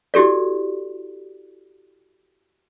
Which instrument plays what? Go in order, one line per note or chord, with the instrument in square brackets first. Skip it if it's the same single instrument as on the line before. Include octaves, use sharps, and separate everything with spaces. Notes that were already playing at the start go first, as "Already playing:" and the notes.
[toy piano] E4 F#4 G4 A4 D5